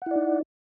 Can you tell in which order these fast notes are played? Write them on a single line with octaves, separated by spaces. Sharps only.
F#5 E4 D5 D#4